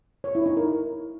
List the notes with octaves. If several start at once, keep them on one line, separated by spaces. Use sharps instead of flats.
C#5
E4
D#4
A#4